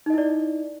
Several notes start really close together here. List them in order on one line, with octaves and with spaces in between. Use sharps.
D#4 D#5 E4 D5